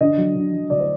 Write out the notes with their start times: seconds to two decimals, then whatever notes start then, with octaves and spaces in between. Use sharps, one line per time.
0.01 D3 D#5
0.17 F#3
0.35 D3
0.53 F#3
0.70 D2 D5
0.80 C5